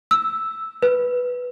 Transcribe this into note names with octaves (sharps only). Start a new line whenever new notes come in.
E6
B4